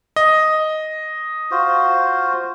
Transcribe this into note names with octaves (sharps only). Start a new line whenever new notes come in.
D#5
F4 F#4 C5